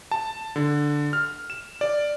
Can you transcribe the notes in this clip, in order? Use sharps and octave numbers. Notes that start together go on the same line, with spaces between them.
A5
D3
F6
E7
D5